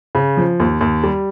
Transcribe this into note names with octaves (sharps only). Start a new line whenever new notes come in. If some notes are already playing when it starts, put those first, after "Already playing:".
C#3
F3
D#2
D#2
G3